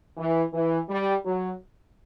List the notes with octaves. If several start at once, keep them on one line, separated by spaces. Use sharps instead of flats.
E3
E3
G3
F#3